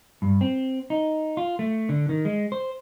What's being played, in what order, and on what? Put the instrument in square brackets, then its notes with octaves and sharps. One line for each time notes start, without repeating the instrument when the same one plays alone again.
[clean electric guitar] G2
C4
D#4
F4
A3
D3
D#3
G#3
C5